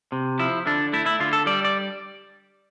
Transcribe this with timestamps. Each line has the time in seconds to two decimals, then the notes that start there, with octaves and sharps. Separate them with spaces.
0.12 C3
0.39 F3 E4
0.66 D3 D4
0.93 A3 E4
1.06 E4
1.20 D3 F4
1.33 A4
1.46 G3 D5
1.65 D5